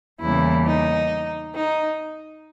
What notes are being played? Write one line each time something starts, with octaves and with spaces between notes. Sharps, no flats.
E2 C#3 E3 G3 A#3 E4
D#4
D#4